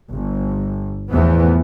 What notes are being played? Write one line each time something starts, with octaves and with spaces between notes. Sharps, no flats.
G1
E2 A2 E3 F3 B3